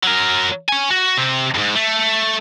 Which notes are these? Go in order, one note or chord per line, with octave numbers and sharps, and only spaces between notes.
F#3 A#4
C#5 G#5
F#4
C3 C4
F2 G#2
A3